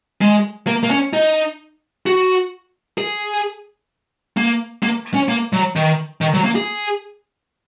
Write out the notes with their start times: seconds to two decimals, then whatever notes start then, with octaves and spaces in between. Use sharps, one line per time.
0.21 G#3
0.67 A#3
0.83 A#3
0.90 C#4
1.13 D#4
2.06 F#4
2.98 G#4
4.37 A#3
4.83 A#3
5.14 C#4
5.28 A#3
5.53 F#3
5.76 D#3
6.21 D#3
6.33 F#3
6.44 A#3
6.55 G#4